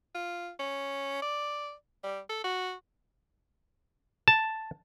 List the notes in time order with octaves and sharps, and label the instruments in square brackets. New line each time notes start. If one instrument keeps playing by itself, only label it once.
[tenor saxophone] F4
C#4
D5
G3
A4
F#4
[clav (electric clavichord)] A5